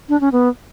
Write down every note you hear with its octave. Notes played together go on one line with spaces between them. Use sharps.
D4
C#4
B3